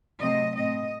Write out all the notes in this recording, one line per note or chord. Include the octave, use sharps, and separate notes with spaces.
C3 F#3 A3 C4 D#5
A2 A3 C4 D#5